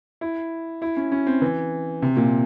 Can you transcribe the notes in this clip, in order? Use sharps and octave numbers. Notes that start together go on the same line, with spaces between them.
E4
E4
C#4
C#4
C4
E3
C3
A#2